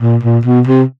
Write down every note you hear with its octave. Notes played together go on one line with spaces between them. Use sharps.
A#2
A#2
B2
C3